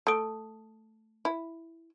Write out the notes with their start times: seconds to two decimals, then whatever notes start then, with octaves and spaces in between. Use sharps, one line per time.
0.07 A3 A5 D#6 D7
1.25 E4